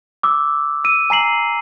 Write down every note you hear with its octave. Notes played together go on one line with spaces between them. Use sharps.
D6 E6
E6 D#7
G#5 A#5 C7 F#7